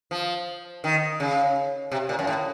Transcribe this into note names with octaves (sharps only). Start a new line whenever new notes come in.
F3
D#3
C#3
C3
A#2
F#2
A2